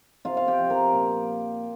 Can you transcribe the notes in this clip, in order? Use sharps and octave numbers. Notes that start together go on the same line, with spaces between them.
C3 F4 F5
F5
G4 G5
F3
A#4 A#5
A#2